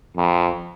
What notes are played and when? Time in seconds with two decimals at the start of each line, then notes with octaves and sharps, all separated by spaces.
0.16 F2